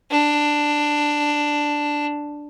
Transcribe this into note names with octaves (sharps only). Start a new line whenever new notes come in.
D4